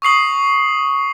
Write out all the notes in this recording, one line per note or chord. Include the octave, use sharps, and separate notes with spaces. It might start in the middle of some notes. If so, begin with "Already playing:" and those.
C#6 D#6 C7 F#7